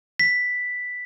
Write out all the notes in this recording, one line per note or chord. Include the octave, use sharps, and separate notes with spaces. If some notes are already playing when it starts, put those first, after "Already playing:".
B6